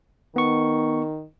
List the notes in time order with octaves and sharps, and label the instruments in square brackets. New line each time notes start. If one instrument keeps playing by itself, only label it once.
[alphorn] D#3 [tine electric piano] B3 C#6